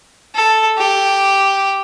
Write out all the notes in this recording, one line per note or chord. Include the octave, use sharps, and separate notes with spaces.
A4
G4